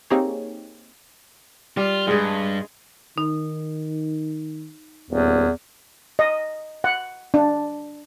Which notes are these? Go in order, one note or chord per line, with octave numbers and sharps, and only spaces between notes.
A#3 C4 D#4 G4 G#4 C#5
G3 F4
G2 G#3 G#4
D#3 D#4
D#1 E2
D#5
F#5
D4